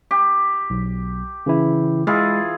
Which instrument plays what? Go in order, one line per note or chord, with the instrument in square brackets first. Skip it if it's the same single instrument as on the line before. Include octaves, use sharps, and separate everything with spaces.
[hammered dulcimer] G4
[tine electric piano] B1
C#3 E3 E4
[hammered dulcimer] E3 F4 G#4 [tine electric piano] G#3